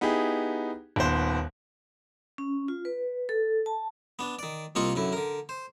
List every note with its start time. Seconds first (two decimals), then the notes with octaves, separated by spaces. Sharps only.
0.01 B3 D#4 E4 G4 G#4
0.96 D#1 D#2 B3 C5
2.38 C#4
2.68 F4
2.85 B4
3.29 A4
3.66 A5
4.19 B3 D4
4.39 D#3 D5
4.75 C2 A#3 C4 F4 D#5 C#6
4.95 F#2 D3 E4
5.13 D3 A#4
5.49 C5